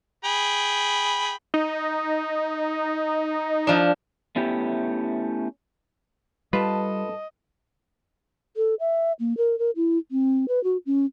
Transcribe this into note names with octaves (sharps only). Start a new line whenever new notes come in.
G#4 G5 B5
D#4
F3 D4
A3 B3 C#4 E4 G4
G2 G3 F4 A4 B4 D#5 A5
A4
E5
A#3
A#4
A#4
E4
C4
B4
F#4
C#4